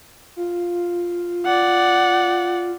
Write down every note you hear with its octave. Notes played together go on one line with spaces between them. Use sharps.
F4
D5 F#5